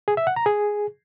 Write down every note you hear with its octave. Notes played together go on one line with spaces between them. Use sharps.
G#4
E5
F#5
A#5
G#4